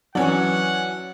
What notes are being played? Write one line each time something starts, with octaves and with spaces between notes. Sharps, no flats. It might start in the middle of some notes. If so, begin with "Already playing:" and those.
E3 F#3 C#4 D4 F#5